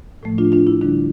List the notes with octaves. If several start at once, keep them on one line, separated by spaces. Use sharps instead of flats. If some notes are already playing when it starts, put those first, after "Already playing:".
A2 F3 A3
D4 F4
D4 F4
E4
D3 G3 D4